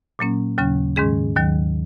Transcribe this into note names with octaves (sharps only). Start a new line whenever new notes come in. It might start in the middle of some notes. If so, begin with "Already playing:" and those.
A#2 F#3 A#3 C#4
D#2 C#3 F#3 C#4
G#2 D#3 G#3 C#4 G#4
D#2 D#3 F#3